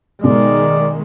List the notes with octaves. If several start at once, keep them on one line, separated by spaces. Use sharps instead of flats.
B1 D#3 G#3 D5